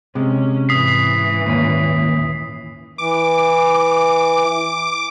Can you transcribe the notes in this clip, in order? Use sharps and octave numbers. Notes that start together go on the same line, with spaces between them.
C3 G#3 C#4
G#2 E3 D#6 B6 C7
D#2 A#2 C#4
E3 D6